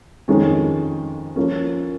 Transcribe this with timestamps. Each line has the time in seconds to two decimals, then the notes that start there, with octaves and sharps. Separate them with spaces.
0.28 F2 D#3 G#3 C#4
1.36 F3 A#3 C#4